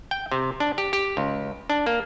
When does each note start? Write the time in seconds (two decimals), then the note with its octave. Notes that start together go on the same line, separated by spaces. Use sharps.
0.11 G5
0.31 C3
0.60 D4
0.78 G4
0.93 G4
1.17 C#2
1.70 D4
1.86 A#3